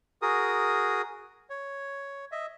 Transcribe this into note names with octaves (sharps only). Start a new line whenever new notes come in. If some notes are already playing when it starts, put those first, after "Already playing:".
F#4 G#4 A#4 D#6
C#5
D#5 E5